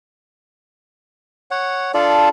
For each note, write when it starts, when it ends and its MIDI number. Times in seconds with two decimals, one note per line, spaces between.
1.51 1.92 73
1.51 1.92 78
1.94 2.29 62
1.94 2.29 65
1.94 2.29 69
1.94 2.29 74